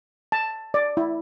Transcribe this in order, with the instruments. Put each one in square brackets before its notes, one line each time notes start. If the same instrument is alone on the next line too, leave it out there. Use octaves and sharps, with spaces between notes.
[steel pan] A5
D5
E4